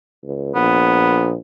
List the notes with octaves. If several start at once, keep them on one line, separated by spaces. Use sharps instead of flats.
C#2
A#1 B3